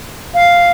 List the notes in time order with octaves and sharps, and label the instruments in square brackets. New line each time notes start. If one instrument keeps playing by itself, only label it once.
[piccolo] F5